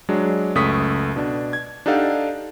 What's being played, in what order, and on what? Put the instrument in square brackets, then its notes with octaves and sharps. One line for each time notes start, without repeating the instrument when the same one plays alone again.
[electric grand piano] F#3 G#3 D4
C#2 F#2 A3 C#6 D#6 B6
B2 D4
G#6
D4 D#4 G4 A4 F5 F#5